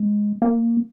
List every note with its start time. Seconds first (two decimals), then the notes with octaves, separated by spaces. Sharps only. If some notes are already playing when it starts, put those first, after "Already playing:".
Already playing: G#3
0.42 A#3